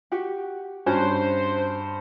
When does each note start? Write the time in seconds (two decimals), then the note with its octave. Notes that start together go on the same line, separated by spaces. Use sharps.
0.12 F#4 G4 F#5
0.86 G2 C#4 F#4 C5 G#5